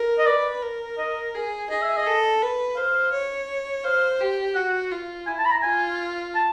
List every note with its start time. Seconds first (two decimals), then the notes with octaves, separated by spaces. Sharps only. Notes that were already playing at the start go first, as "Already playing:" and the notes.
Already playing: A#4
0.18 D#5
0.26 B4 D5
0.62 A#4
0.98 D#5
1.34 G#4
1.70 G#4 D#5
1.82 E5
1.97 D#5
2.06 A4
2.42 B4
2.77 C5 F5
3.12 C#5
3.84 C5 F5
4.20 G4
4.55 F#4 F#5
4.91 F4
5.27 E4 G#5
5.39 A5
5.45 B5
5.51 A#5
5.63 F4 G#5
6.35 A5